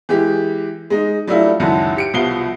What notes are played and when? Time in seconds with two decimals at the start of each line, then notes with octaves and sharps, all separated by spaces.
0.09 E3 G#3 G4
0.90 G#3 D#4
1.27 F#3 G3 A3 D4 E4 F4
1.60 C#2 F#2 D#3 E4 F#4 A5
1.96 G4 C#7 D7
2.14 C2 B2 F3 F5 C7 G7